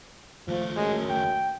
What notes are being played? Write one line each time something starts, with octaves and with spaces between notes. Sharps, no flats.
D#2 F3 A3
F#2 G#3
G5